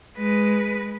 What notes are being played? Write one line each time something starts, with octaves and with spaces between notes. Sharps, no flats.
G#3 B4